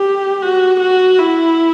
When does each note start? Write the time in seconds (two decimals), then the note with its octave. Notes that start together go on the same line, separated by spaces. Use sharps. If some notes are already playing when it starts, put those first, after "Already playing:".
Already playing: G4
0.43 F#4
0.80 F#4
1.18 E4